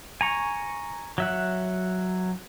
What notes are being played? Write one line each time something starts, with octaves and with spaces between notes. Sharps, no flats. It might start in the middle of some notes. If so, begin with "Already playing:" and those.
G#5 A#5 C#6
F#3 E5 F#5